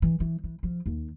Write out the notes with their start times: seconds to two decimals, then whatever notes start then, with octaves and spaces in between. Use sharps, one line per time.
0.02 E3
0.20 E3
0.44 E3
0.63 F3
0.86 D#2